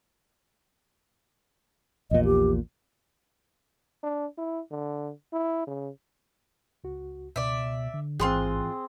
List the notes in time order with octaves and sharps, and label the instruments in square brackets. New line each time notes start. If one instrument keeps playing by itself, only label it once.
[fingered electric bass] A#1 E2 A#2 [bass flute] D#5
[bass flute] G4
[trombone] D4
E4
D3
E4
C#3
[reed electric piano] C#2 F#4
[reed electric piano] C#2 [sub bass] B2 [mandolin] D5 E5
[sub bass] D3
[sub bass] A1 [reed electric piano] G#2 E3 [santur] C4 G#4 [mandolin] F4 C6 F#6